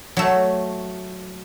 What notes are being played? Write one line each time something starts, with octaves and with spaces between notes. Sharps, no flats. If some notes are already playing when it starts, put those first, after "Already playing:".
F#3 A3